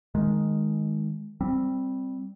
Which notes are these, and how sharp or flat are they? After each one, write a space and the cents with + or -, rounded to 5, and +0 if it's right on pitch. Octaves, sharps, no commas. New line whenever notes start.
D#3 +0 G#3 +5
G3 +0 C4 +0